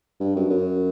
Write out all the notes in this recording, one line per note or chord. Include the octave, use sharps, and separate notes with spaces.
G2
F#2
F#2